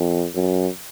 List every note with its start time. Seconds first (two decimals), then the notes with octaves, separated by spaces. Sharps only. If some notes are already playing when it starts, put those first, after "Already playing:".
Already playing: F2
0.35 F#2